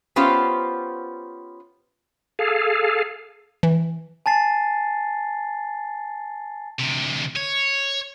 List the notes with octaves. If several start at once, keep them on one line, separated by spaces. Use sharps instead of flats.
B3 C#4 F4 G4 C5
G#4 A4 F5
E3
G#5 A5 A6 C7
D2 C3
C#5